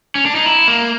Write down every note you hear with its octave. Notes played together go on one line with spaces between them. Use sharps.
C#4
D4
D#4
E4
A#3